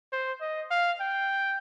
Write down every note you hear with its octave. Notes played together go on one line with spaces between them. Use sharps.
C5
D#5
F5
G5